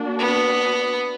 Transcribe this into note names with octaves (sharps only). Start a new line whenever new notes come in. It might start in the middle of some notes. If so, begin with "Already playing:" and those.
Already playing: A#3 D4 F#4
B3